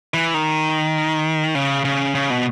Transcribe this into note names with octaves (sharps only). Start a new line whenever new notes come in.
E3
D#3
C#3
C#3
C#3
B2